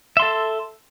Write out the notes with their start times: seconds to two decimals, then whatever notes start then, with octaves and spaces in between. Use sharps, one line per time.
0.17 E5
0.20 C6
0.22 A4